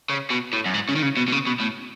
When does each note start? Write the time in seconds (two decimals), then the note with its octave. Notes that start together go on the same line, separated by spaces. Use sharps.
0.10 C#3
0.31 B2
0.53 A2
0.66 F#2
0.74 G#2
0.89 C#3
0.96 D#3
1.02 C#3
1.17 B2
1.28 B2
1.32 C#3
1.47 B2
1.60 A2